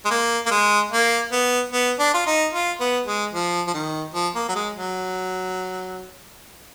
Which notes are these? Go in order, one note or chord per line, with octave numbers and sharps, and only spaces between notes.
G#3
A#3
A#3
G#3
A#3
B3
B3
D4
F4
D#4
F4
B3
G#3
F3
F3
D#3
F3
A#3
F#3
G#3
F#3